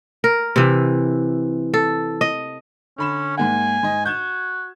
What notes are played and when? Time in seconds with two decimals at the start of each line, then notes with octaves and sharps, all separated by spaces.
0.24 A#4
0.56 C3 E3
1.74 A4
2.21 D#5
2.98 D3 C#4 B5 E7
3.37 G#2 A#3 F#5 G#5
3.83 G#2 D#5
4.06 F#4 G6 G#6 E7